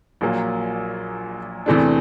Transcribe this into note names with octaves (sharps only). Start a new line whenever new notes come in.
A#1 A#2 F#3 A#3
E2 C3 E3 A3 D4